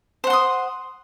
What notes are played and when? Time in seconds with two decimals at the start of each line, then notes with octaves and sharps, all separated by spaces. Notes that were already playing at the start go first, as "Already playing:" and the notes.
0.24 C5
0.27 F#5
0.30 C6
0.33 D#6